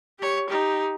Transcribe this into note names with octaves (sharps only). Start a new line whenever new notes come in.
G4 C#5
D#4 G4